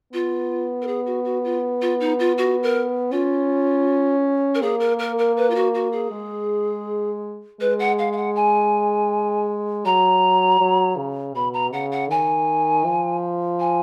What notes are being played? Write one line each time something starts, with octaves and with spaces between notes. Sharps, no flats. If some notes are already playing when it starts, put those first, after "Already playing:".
B3 F4
A#4
G#4
F#4
F#4
F4
F4
D#4
F4
F#4
A#4
C#4 F4
A#4
A#3 G#4
A#4
A#4
A#4
B4
F4
F#4
F#4
G#4
G#3
G#3 B4
F#5
F5
F5
F#5
G#5
F#3 A#5
F#3
C#3
B2 B5
A#5
C#3 F#5
F#5
D#3 G#5
F3
G#5